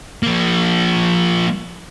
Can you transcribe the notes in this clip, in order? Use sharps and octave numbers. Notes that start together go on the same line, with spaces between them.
F3 A#3